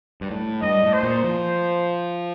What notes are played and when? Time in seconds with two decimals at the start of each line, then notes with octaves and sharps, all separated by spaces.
0.21 G2
0.31 A2
0.62 G2 D#5
0.83 A2
0.93 C5
1.03 A#2
1.24 F3